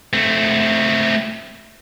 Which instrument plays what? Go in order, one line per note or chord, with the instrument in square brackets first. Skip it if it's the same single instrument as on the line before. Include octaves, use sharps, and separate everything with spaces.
[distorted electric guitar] A3 C4